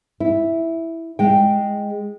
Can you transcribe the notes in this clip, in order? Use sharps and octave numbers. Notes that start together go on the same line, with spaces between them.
E4
G#3 G5